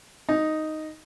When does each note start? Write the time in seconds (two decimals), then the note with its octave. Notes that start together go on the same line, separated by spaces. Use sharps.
0.29 D#4